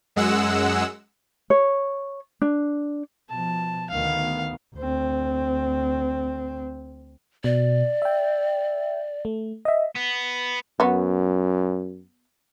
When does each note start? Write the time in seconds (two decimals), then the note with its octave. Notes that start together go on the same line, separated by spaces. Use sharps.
0.16 F#2 G#3 F#5 E6
1.50 C#5
2.42 D4
3.29 B2 F3 A5
3.90 D2 D#3 B3 F5
4.75 D2 C4
7.44 B2 D5
8.02 E5 G5
9.25 A3
9.65 D#5 E5
9.96 B3
10.80 F#2 B3 F#4